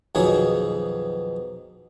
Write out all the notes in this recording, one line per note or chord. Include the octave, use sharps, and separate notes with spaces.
B1 F2 B2 D#3 G#4 C#5